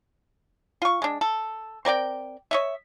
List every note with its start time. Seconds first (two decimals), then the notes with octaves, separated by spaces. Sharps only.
0.82 F4 C#6
1.02 G#3 D4
1.21 A4
1.85 C4 A#4 D5 G5
2.51 C#5 D#5 E5